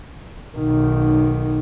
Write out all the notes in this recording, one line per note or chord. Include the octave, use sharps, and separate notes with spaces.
B1 D#3